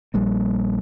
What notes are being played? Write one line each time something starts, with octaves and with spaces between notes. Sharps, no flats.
A#1 G3 A#3